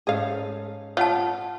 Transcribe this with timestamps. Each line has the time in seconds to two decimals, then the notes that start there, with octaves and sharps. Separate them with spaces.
0.07 G#2 C#4 G#4 A4 F5
0.97 F4 C#5 F#5 A5